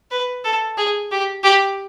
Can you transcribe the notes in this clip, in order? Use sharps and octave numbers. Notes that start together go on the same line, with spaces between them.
B4
A4
G#4
G4
G4